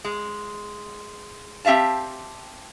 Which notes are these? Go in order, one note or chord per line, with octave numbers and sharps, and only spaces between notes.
G#3
C4 G4 E5 F5 A5